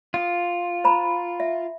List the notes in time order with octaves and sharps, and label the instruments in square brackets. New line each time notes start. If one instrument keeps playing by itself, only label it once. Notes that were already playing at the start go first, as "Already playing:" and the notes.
[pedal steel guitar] F4 [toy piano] D#6
[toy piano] C5 A#5 B5
E5